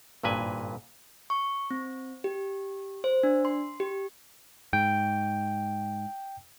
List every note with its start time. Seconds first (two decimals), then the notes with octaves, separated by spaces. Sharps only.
0.23 G#1 G2 A#2 B4 G#5
1.30 C#6
1.71 C4
2.24 G4
3.04 C5
3.23 D4
3.45 C6
3.80 G4
4.73 G#2 G5